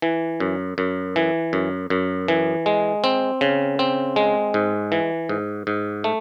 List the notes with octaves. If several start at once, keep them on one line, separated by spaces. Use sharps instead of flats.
E3
F#2
F#2
E3
F#2
F#2
E3
G#3
C4
C#3
C4
G#3
G#2
E3
G#2
G#2
A3